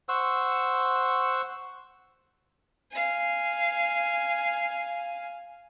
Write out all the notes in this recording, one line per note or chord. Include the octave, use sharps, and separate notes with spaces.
C5 F#5 C#6 E6
F5 G#5